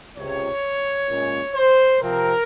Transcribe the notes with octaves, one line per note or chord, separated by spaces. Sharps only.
C#2 C3 F3 C#5
A#2 G#3 C#4
C5
C3 F3 C4 A#4